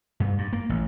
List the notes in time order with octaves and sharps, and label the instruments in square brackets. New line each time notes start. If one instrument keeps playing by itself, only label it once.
[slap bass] G2
G2
A#3
A1